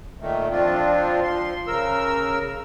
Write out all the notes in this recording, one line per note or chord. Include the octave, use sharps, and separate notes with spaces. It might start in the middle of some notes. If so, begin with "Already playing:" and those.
A#2 D#3 A3
F3 C4 D4 F4
F3 C6
C#3 A#4 E6